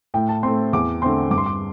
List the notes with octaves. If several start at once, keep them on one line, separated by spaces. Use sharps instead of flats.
A2 G5
A5
A3 C4 C6
E2 D6
D3 A3 C4 C6
G2 D6
C6
D6